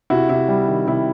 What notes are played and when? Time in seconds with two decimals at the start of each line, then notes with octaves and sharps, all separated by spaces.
0.10 C3 E4 F#4
0.29 C3 E4
0.48 G3
0.68 D#3
0.87 C3 E4